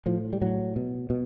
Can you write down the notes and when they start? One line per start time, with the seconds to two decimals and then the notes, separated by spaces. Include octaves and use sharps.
0.06 A2 F3
0.33 G3
0.41 A2 F#3
0.76 B2
1.10 B2